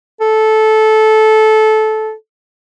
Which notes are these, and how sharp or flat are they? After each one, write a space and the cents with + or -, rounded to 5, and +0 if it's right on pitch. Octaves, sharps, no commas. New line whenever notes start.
A4 -15